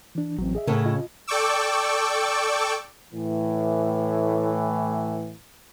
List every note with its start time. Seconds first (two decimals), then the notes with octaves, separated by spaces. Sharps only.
0.15 E3 D4
0.38 A1 F#3 C4
0.55 G#4 D#5 E5
0.67 A2 C#3 C#4 A4 A#4
0.86 F4 D#5
1.27 A4 D5 G5 C#6 D6 E6
3.13 A2 E3